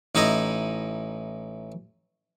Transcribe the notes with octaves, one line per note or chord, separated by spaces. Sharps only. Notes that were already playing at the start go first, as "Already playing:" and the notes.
A1 D#4 E4 D#5 A#5